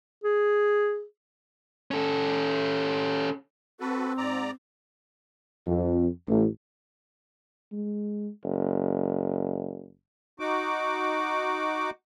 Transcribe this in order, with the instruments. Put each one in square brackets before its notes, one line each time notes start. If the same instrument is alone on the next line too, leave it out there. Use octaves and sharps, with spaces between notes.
[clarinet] G#4
[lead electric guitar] C#4 A4
[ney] C4 [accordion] F#4 A4 B4
[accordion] G#2 D5 A#5
[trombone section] F2
A1
[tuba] G#3
F#1
[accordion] D#4 F#4 D6